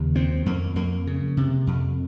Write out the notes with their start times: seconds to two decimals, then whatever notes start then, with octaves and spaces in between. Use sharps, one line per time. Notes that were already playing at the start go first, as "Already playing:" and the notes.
Already playing: D#2 C#3
0.15 F2 C4
0.46 F2 A#3
0.75 F2 A#3
1.07 C#3
1.37 C3
1.67 F2